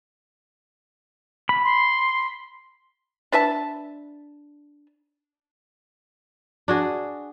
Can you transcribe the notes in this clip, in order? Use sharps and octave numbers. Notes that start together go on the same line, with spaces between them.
B5
C6
D4 B4 E5 A5
D4 F#4 G#4